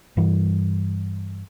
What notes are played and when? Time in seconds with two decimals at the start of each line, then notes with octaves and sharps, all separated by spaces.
0.17 G2 E3 G3